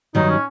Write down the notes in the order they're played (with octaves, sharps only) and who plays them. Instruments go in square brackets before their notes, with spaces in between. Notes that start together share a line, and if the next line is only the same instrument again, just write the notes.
[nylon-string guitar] G2 D#3 F#3 [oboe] D#4
[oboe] C#4